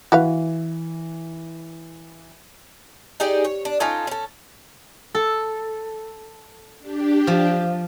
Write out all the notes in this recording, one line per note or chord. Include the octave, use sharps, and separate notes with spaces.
E3 F#4 B4 F5
D#4 G4 G#4 D5
C#5
D4
C#4 D#4 F4 A4
C#4 A4
A4
D4 G4
F3